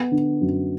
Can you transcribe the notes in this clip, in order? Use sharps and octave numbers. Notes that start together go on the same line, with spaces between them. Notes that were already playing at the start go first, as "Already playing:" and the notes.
Already playing: B3
D3
F#2